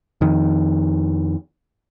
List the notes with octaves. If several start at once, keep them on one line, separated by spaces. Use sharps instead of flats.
F2 D#3